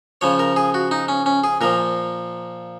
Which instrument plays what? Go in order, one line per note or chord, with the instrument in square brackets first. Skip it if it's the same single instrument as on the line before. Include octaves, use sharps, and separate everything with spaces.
[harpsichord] C#3 F3 C#5
A#4
G#4
F#4
D#4
C#4
C#4
G#4
A#2 F3 A#4